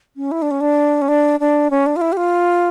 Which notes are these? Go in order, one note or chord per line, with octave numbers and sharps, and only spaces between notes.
C#4
E4
D4
C#4
D4
C#4
D4
D4
C#4
D4
F4
E4
G4
F4